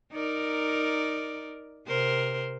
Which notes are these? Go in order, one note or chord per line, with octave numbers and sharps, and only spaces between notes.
D#4 A#4 D5
C3 A#4 C5